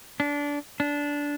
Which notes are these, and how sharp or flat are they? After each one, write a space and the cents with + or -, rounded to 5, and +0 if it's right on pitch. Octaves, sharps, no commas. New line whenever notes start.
D4 -20
D4 -15